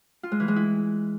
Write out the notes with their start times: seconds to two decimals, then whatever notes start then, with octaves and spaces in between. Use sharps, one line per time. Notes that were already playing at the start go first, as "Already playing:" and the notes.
0.23 F4
0.32 G#3
0.40 E3
0.48 G#3
0.56 E4